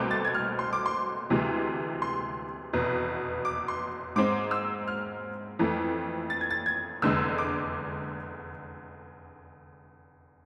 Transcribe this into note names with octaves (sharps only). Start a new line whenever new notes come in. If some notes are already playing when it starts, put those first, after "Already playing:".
Already playing: C2 B2 A3 C4 D6
A6
G#6
F6
C6
D6
C6
D2 C3 E3 G#3
C6
F1 E2 B2 B3
D6
C6
G#2 G#3 C4 D6
E6
F6
F2 E3 A3
A6
G#6
A6
G#6
F1 E2 D3 G#3 E6
D6